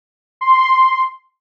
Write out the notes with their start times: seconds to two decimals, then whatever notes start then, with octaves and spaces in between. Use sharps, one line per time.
0.41 C6